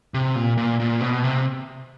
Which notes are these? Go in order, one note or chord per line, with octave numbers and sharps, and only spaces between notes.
C3
A#2
A#2
A#2
B2
C3